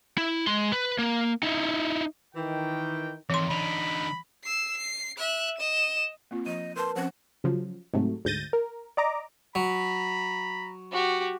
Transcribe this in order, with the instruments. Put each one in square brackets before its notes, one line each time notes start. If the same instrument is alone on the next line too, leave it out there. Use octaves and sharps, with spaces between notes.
[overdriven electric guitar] E4
G#3 C6
B4
A#3
D#4 E4
[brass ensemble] D#3 G5 [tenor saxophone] E3
[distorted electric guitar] F2 D#3 [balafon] E3 C6
[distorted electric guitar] D3 D#4 [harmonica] B5
[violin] E6 C7
C7
E5 F#6
D#5 E7
[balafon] A#3 C4 F4
[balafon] F3 [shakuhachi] D#5 [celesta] D#7
[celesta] A#4 B4 A5 [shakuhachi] C6
[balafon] F3 C4 C#4 [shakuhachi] F#5
[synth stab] C#3 F3 F#3
G#2 C3 F#3 A3
D2 G#2 G6 A6 A#6 D#7
A#4
D5 D#5 A#5 D6
[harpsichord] F#3 [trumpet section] A#5 B5
[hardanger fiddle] F#4 G4